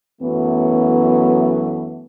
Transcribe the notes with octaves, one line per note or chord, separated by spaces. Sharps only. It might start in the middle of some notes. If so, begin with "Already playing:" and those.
F#2 E3 F#3 A3 B3